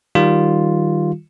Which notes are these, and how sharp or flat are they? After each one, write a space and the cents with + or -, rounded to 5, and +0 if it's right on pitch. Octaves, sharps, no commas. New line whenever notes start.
D#3 +0 G3 -15 F4 +0